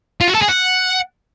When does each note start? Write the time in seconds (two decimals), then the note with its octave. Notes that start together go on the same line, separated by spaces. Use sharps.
0.21 F4
0.28 F#4
0.35 A4
0.42 G#4
0.49 F#5